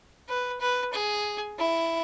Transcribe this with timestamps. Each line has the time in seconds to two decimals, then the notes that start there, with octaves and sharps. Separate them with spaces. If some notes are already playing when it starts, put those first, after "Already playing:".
0.29 B4
0.61 B4
0.93 G#4
1.59 E4